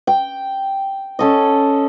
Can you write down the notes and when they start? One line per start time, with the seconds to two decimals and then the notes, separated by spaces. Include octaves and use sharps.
0.07 G5
1.19 C#4 A4 D#5